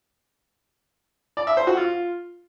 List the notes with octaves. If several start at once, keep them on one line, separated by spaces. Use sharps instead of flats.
D5
E5
C5
F#4
F4